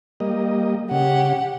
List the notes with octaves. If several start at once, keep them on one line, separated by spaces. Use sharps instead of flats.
G3 A#3 D#5
C#3 G4 F#5